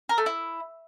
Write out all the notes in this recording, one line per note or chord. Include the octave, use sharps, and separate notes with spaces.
A#4
A3
E4